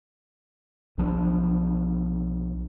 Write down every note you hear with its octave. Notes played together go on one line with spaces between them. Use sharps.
B1 F3 F#3 D4